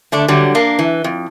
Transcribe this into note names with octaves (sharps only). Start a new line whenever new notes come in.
D3 A3 D4
D3 F#3 G3
A#3 D4
E3
F2